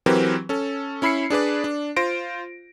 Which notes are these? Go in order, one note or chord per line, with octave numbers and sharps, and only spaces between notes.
E3 F#3 C4 G4 A#4 B4
C#4 A4
C#4 E4 B5 E6 C7 C#7
D4 G#4 B4 D5
D4
F4 C5 A#6 D7